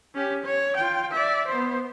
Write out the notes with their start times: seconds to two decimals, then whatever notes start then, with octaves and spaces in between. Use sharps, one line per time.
0.15 C#4 G4
0.44 C#5
0.77 F4 G5
1.12 D5 E5
1.48 B3 C5